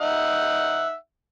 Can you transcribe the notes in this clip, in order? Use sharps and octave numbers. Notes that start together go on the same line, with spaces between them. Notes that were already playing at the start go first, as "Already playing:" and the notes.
D#4 E5 F#5